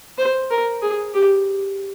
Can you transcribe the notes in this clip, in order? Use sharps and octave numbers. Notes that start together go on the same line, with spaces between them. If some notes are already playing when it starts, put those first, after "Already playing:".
C5
A#4
G#4
G4